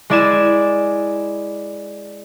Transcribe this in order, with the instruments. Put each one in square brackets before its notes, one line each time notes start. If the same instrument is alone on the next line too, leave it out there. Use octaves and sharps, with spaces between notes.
[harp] G#3 E4 D5 G#5 E7